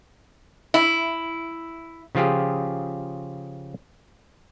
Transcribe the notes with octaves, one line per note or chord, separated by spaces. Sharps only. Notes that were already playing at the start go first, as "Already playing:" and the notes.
E4
C#3 F3 F4 G4 G#4